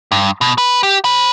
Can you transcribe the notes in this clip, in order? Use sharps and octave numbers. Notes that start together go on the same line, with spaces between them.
G2
B2
B4
G4
C5 B5